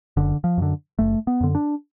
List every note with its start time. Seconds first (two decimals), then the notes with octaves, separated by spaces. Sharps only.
0.17 F#1 D3
0.44 F3
0.58 F#2 D3
0.99 F#1 A3
1.27 B3
1.41 F#2 D3
1.55 D4